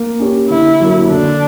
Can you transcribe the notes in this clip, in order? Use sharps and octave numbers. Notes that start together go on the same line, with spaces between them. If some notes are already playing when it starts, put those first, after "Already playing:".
Already playing: A#3
C#4 G4 C#5
D3 E4
F#3 A#3
D3 D4